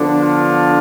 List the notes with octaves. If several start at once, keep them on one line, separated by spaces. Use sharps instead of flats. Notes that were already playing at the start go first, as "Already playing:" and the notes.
Already playing: D3 F3 B3 D4
F4